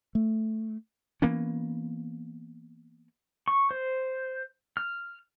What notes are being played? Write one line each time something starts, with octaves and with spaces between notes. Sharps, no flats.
A3
E3 A#3 B3 C#4
C#6
C5
F6